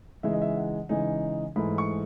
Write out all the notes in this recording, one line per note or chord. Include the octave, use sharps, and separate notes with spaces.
C#3 E3 G#3 D#4 E5
D#5
E5
F#5
C#3 E3 G#3 D#4 G#5
G#2 E3 A3 B5
C#6